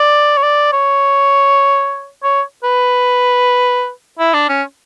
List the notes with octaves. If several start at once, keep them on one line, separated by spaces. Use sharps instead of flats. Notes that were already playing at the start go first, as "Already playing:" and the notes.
Already playing: D5
C#5
D5
C#5
C#5
B4
E4
D4
C#4